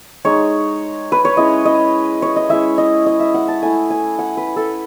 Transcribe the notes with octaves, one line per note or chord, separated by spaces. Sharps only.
G#3 D#4 C#5
B4
C#5
G#3 C#4 E4 D#5
D#5
C#5
D#5
G#3 C#4 E4 E5
D#5
D#5
E5
F#5
A5
A3 E4 G#5
G#5
F#5
B4
A4